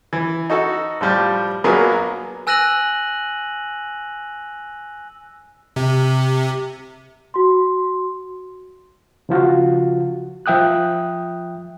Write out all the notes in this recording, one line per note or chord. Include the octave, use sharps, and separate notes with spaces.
E3
D#4 F#4 A4
A2 F3 G3
A#1 F#3 A#3 B3 G#4 A#4
G#5 E6 F#6 A#6 D#7 F#7
C3
F#4 C6
C#3 F3 F4 F#4
F3 E5 G5 D#6 F#6